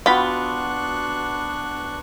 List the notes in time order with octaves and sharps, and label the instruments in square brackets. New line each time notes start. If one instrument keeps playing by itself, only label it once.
[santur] B3 F#4 [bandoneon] D4 C#6 F#6 [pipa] F4 [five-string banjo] G5 B5